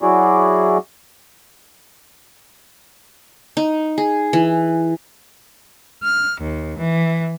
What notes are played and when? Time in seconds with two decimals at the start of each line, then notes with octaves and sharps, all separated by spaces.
0.02 F#3 E4 F#4 G#4 D5
3.57 D#4
3.98 G#4
4.33 E3
6.03 F6
6.41 D#2
6.78 E3